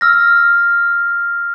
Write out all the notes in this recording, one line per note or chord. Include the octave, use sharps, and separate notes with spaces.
E6 F6 A#6